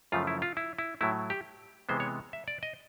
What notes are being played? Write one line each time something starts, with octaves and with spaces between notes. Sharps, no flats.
F#2 C#3 F3 A3 F4
E4
F4
E4
E4
A2 F#3 A3 E4
G4
C3 E3 G#3 B3 C5
C#5
E5
D5
D#5